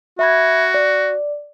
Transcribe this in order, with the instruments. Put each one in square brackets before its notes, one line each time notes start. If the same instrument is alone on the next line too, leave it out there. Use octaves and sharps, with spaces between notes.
[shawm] F#4 [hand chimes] E5 B5 G#6
[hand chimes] D5